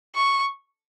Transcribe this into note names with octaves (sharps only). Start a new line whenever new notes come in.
C#6